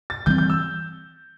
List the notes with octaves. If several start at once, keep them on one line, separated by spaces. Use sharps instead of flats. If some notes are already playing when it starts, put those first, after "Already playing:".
A6
E3 G3 C4 G6
G6
E6